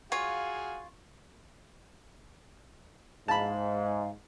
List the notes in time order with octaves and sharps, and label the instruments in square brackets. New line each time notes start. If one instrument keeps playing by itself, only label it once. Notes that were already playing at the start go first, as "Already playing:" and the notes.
[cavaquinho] F4 C#5 [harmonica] F#4 G#4 G#5 [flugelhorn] F5
[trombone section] G#2 [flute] F5 [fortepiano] A5 B5